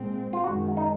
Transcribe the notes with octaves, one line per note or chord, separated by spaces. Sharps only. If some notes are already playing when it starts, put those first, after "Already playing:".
Already playing: A#2 G#3 C4
F4
F#2 D#3 G#3 F#4
D#4